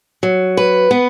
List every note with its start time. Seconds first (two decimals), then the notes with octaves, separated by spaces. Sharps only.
0.23 F#3
0.57 B4
0.91 B3